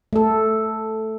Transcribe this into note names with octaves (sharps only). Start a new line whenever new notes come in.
A3 A4